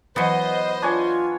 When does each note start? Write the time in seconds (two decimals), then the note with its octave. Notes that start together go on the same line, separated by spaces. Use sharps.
0.16 E3 F#3 B3 C5 D#5
0.82 D4 F4 C#5 G#5